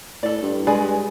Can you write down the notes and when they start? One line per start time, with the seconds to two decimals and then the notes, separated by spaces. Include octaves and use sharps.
0.23 A2 A4 D5
0.43 G2
0.67 G#3 G#4 B4 D5